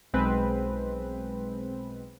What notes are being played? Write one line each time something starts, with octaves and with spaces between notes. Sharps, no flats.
B1 G#3 C4 B4